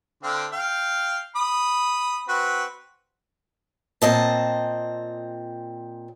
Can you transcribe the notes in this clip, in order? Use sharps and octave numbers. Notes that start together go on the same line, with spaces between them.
D3 C4 F5
F5 G5
B5 D#6
C4 F#4 B4
A#2 C4 D#5 A5